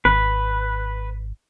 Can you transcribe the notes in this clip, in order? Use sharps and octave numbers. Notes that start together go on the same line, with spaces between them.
G#1 B4